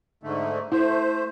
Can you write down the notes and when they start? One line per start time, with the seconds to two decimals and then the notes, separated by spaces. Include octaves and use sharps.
0.23 G#2 D3 A3
0.72 A3 E4 C5